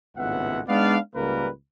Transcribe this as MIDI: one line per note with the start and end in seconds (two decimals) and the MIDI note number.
0.17 0.61 32
0.17 0.61 37
0.17 0.61 45
0.17 0.61 59
0.17 0.61 76
0.17 0.61 78
0.68 0.97 56
0.68 0.97 59
0.68 0.97 62
0.68 0.97 63
0.68 0.97 74
0.68 0.97 77
1.15 1.48 37
1.15 1.48 44
1.15 1.48 55
1.15 1.48 58
1.15 1.48 70
1.15 1.48 71